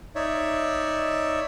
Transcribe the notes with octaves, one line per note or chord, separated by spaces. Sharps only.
D#4 C#5 D5 E5